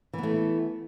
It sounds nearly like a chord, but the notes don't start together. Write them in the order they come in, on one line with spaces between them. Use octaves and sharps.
E3 B3 A3